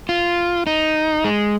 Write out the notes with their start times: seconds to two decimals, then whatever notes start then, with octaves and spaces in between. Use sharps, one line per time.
0.09 F4
0.67 D#4
1.24 G#3